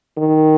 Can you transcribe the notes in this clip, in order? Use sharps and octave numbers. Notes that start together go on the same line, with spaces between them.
D#3